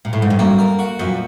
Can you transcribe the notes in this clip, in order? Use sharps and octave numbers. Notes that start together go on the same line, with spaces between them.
A#2
A2
G#2
G2
F#2 A#3
A#4
F#4
F#2 A#2